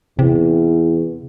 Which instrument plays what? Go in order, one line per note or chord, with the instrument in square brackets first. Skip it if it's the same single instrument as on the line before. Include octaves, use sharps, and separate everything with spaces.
[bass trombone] E2 [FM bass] C3